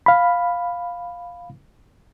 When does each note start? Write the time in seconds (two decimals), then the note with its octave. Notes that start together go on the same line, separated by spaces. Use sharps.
0.06 F5 B5